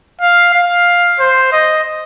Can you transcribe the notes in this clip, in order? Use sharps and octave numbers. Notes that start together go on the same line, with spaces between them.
F5
F5
C5
D#5